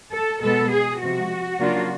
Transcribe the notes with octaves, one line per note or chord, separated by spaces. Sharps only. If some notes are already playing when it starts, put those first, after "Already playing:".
A4
B2 G#3 B3 A4
G#4
C3 F3 G#3 F#4
C#3 F#3 A#3 D4 F4